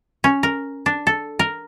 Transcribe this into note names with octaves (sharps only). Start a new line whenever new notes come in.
C#4
A#4
D4
A4
A#4